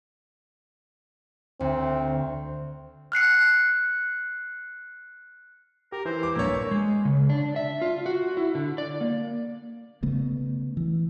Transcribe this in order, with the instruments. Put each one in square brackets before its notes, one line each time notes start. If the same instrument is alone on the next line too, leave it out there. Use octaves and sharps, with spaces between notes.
[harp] D2 [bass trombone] C4
[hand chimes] F6 F#6 C7 C#7
[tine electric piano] G4 [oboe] A#4
[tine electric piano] E3 [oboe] C5
[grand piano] D6
[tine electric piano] A#1 G2 [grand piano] A#3 C#5 [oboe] E4
[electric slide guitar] G#3
C#3
D4
E5
F4
F#4
E4
D3
D5
A#3
[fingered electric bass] C#3 A3 B3
E3